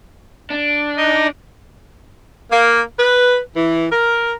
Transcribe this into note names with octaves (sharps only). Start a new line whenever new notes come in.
D4
D#4 D#5
A#3
B4
E3
A#4